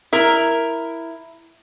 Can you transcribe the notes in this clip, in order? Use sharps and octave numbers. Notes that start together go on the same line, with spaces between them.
E4 A#4